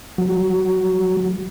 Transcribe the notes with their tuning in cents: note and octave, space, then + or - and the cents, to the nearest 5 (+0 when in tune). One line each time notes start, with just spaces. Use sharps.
F#3 +10